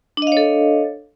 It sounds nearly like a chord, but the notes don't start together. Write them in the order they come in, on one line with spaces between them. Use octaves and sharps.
D4 D#5 F5 C#5 A4